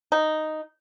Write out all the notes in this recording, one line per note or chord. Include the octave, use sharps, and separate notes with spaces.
D#4